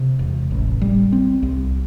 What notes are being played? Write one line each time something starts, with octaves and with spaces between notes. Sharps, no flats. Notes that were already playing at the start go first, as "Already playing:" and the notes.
Already playing: C3
E1
A1
G3
C4
C2